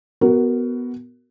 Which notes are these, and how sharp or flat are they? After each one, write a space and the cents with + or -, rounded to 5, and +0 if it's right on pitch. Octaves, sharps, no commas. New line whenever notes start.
B3 +0 F#4 +20 A#4 -10